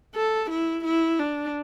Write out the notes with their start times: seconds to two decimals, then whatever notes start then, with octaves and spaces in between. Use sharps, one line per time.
0.15 A4
0.50 E4
0.85 E4
1.19 D4